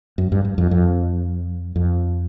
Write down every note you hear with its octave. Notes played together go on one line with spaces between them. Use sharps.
F#2
G2
G2
F2
F2
F2